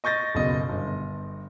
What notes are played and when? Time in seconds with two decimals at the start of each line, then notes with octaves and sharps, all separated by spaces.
0.04 D#5 C#6 G6 A6 A#6
0.35 F#1 B2 D#5
0.69 G1